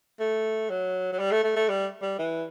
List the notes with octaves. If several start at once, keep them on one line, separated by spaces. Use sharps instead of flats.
A3
F#3
F#3
G3
A3
A3
A3
G3
G3
E3